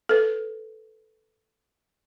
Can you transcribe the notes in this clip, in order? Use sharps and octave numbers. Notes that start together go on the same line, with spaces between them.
A4 B4